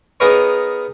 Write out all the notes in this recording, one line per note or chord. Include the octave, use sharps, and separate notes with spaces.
B3 D#4 G#4 A#4 B4 C#5